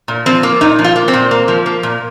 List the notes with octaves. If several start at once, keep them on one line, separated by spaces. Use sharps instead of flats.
A#2
F3 C4
A#3
A#2 D#4
F3
F4
A#3
C4
A#2
A#3
F3
A#3
A#2